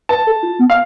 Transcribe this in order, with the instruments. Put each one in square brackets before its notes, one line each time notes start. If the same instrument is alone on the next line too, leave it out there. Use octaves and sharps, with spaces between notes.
[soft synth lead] B4 [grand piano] A5
[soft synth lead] A4
F4
B3
[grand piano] F5